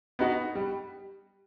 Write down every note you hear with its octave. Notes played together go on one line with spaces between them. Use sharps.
B3 D#4 F#4
G3